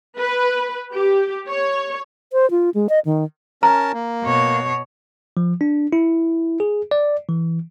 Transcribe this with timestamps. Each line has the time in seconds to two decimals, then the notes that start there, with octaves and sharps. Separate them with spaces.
0.18 B4
0.94 G4
1.49 C#5
2.33 C5
2.51 F4
2.74 G#3
2.89 D#5
3.05 D#3
3.63 C#4 A#4 A5 A#5
3.94 A#3
4.24 B2 C#5
5.37 F3
5.61 D4
5.93 E4
6.60 G#4
6.91 D5
7.29 E3